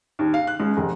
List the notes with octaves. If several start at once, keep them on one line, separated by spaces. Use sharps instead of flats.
D#2
F5
F#6
C#2
F1